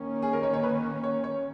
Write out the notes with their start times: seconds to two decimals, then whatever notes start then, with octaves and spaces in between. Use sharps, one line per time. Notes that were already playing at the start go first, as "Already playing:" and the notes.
Already playing: D#3 A#3 C#4
0.22 G#4
0.33 A#4
0.43 C#5
0.54 C#5
0.63 B4
1.04 C#5
1.24 C#5